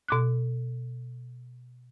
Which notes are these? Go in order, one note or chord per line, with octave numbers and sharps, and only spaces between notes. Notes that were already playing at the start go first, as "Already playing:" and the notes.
B2 D6 F#6